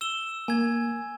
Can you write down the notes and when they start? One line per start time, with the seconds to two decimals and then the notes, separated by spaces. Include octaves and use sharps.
0.01 E6 E7 G7
0.48 A#3 G#5 G#6